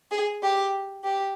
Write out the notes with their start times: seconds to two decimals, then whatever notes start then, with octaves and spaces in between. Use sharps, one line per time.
0.11 G#4
0.42 G4
1.04 G4